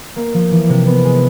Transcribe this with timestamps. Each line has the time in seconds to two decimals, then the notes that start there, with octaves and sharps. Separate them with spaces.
0.16 A#3
0.34 F3
0.51 E3
0.69 C3
0.86 B3
1.04 G#3